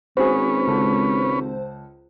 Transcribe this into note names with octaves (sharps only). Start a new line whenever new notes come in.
G#1 C#4 F#4 G#4 B4 C5
C#2 A4